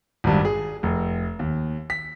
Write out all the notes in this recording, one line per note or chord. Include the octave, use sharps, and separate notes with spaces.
G#1 G2
G#4
F1
D#2
B6